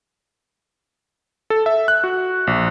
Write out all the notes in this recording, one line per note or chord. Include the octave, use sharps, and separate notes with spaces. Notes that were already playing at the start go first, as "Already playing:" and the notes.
A4
E5
F#6
F#4
A#1